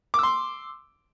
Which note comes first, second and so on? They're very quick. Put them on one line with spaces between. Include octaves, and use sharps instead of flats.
D6 E6 C6